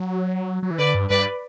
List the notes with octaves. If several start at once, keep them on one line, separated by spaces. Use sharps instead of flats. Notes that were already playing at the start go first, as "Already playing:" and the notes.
Already playing: F#3
F#3
E3
D3 B4 D5
G2
G2 B4 D5